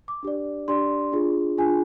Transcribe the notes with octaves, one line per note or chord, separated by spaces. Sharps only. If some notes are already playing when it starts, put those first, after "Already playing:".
D6
D4 G4 D5
D4 G4 D5 C6
D4 F4 G#4
D4 F4 G#4 G#5